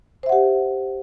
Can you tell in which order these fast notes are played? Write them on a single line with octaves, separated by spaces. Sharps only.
C5 E5 F#5 G4